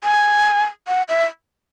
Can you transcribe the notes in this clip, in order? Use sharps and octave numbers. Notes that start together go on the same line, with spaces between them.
G#5
F#5
E5